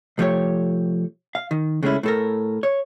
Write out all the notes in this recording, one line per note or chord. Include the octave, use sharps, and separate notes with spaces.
C2 F3 A3 G4 C#5
F5
D#3
C#3 G#3 A3 C#4 E4
A2 A4 A#4
C#5